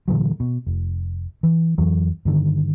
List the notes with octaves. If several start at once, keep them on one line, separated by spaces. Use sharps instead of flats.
A#2 D3 E3 F#3
B2
F1
E3
F2 E3 F#3
G2 D3 D#3